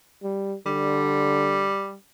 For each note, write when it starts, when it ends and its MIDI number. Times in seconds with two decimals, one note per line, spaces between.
0.23 0.56 55
0.66 1.74 50
0.66 1.95 55